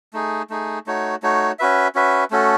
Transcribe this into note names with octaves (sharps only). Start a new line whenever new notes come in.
A3 D#4 G#4
A3 D#4 G#4
A3 D#4 F#4 C#5
A3 D#4 F#4 C#5
C#4 F#4 B4 E5
C#4 F#4 B4 E5
A3 C#4 F#4 A4